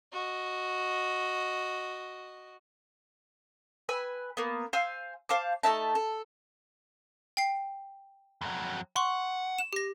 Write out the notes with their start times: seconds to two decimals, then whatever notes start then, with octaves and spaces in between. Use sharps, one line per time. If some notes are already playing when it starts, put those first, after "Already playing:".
0.12 F#4 D#5
3.89 B4 G#5 E6
4.37 A#3 B3
4.73 C5 F5 G#5 E6
5.29 C5 F5 A5 D6
5.63 A3 D#4 E5 A5
5.95 A4
7.37 G5 C7
8.41 F2 F#3
8.96 F#5 C6 C#6
9.59 E7
9.73 G4 A#6